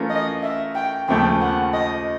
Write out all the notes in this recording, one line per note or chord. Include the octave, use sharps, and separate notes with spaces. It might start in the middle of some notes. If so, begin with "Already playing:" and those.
Already playing: E3 A3 C#4 F4 A#4
D#5
E5
G5
D#2 C#3 F3 A3 G5
F#5
D#5